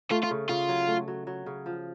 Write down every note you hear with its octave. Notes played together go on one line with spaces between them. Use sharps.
A3 F4
F4
C#3
C#3 F4
F#3
A3
F#3
F#3
C#3
F3